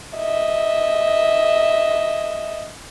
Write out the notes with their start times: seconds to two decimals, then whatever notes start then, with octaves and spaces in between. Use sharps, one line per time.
0.17 D#5 E5